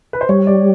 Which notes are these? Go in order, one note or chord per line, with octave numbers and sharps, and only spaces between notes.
B4
C5
G3 C#5
D5